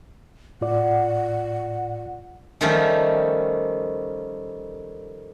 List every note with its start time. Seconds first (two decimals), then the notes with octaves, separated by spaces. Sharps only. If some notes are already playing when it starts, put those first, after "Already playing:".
0.61 A2 F4 D5 F#5
2.61 D#3 F3 G3 A3 C#4 D#4